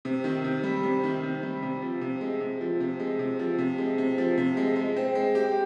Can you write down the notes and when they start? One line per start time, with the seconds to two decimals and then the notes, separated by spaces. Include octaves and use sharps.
0.05 C3
0.24 D#3
0.44 C3
0.64 G3
0.83 C3
1.03 D#3
1.23 C3
1.43 G3
1.63 C3
1.82 F3
2.01 C3
2.21 G#3
2.40 C3
2.61 F3
2.80 C3
2.99 G#3
3.19 C3
3.39 F3
3.58 C3
3.78 G#3
3.98 C3
4.18 F3
4.38 C3
4.57 G#3
4.76 G#3
4.97 C4
5.15 G#3
5.35 G4